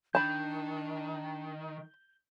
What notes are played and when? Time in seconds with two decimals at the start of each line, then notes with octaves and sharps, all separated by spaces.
0.15 D#3 D4 A5 B5 G6